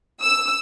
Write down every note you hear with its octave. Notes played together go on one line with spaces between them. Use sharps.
E6